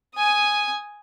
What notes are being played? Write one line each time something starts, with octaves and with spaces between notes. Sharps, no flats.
G#5 D#6